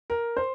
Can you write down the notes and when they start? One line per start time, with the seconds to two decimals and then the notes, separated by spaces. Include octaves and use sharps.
0.10 A#4
0.37 C5